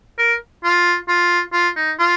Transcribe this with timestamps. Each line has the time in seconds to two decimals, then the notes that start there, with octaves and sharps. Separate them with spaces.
0.18 A#4
0.64 F4
1.08 F4
1.53 F4
1.76 D#4
1.99 F4